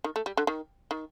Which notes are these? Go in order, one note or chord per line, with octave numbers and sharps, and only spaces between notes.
D#3
A3
G3
D3
D#3
D#3